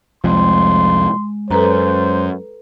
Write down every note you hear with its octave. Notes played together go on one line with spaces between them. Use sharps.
C2 F2 F3 G#3 C6
F#2 A4 B4 C5 A#5